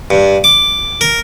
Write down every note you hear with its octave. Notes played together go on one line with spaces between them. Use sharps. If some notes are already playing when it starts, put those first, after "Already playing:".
G2
D6
A#4